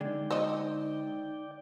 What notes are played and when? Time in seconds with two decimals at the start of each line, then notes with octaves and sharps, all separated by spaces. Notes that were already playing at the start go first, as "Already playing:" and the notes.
0.01 D3 G#3 D#4 D5 G5
0.30 C5 C#5 D#5